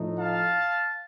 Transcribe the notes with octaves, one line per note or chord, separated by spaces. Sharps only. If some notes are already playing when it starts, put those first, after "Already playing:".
Already playing: A2 F3 A3 D#4
F5 A5